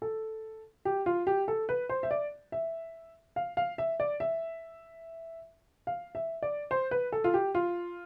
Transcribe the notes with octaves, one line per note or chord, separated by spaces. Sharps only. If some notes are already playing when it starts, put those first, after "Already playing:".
A4
G4
F4
G4
A4
B4
C5
E5
D5
E5
F5
F5
E5
D5
E5
F5
E5
D5
C5
B4
A4
F4
G4
F4